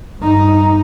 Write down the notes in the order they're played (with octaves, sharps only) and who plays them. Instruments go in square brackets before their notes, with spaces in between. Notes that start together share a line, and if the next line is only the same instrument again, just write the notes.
[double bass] G2 D#4